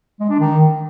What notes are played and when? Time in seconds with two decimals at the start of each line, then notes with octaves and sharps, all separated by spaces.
0.20 G#3
0.30 D4
0.39 D#3